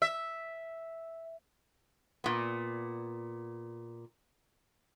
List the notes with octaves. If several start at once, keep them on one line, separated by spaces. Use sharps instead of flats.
E5
A#2 B3